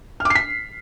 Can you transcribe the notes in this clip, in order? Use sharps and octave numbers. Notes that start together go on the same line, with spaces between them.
F6
D6
C7
B6